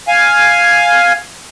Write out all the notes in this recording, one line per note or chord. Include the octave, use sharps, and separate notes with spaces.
F5 G#5